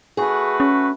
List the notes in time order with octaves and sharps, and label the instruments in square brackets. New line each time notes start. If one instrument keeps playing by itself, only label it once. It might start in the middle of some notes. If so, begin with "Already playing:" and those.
[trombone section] A3 F#4 B4 [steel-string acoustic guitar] G#4
[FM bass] C#4